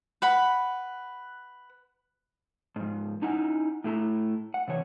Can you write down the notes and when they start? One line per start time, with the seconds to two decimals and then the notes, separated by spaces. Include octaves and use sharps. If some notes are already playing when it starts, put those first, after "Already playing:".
0.22 B4 F#5 B5
2.76 G#2 F3
3.22 C#4 D#4 E4 F#5 G#5
3.84 A2 A3 E4 A#5
4.54 F#5
4.68 C3 E3 C#5